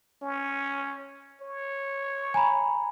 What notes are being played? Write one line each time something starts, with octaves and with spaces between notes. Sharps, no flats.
C#4
C#5
G#5 A#5 B5